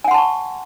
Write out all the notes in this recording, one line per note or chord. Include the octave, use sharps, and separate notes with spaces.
F#5 G#5 A5 C6 C#6